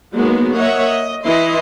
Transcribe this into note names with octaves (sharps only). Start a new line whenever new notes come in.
F#3 G#3 A#3 B3 D#4 F#4
A#3 C#5 D#5 E5 F#5
D#5
E3 E4 D#5 C6